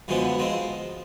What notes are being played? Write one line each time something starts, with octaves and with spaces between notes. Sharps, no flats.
F#2 D3 F3 G#3 B3
F3 G#3 C4